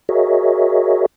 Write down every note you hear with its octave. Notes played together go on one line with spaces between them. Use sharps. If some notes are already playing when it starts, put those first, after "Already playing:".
F#4 G#4 A#4 C#5 D#5 E5